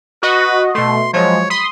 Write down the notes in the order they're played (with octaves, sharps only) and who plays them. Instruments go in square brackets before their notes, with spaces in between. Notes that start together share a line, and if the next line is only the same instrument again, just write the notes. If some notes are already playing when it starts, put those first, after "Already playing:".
[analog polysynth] F#4 D#5 [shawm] B4
[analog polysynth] B2 A3 [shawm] C6
[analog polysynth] F3 F#3 G#3 [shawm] C#5
[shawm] B5 [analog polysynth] C6 D#6